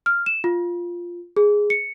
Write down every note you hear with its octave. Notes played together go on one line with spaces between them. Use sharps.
F6
E7
F4
G#4
C#7